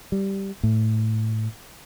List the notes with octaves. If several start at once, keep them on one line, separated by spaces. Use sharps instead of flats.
G3
A2